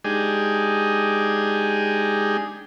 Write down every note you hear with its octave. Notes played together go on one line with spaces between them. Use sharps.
G#3 D4 D#4 G4 G#4